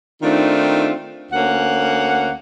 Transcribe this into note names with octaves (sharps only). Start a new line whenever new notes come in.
D#3 A3 C4 D4 D#4 F4
D2 A#3 C#4 F#5